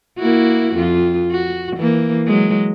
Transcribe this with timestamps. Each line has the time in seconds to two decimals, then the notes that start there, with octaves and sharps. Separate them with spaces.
0.19 A#3 E4 F#4
0.76 F2 F4
1.32 F#4
1.77 E3 A#3
2.27 F#3 G#3